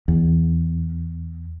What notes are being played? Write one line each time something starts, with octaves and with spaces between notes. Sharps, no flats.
E2